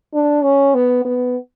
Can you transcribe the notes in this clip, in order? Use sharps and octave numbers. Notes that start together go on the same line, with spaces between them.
D4
C#4
B3
B3